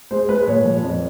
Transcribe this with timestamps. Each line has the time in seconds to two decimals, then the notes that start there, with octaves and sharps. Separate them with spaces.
0.11 G#3 C5
0.29 G#3 B4
0.47 A#2 C#5
0.65 F3
0.83 F2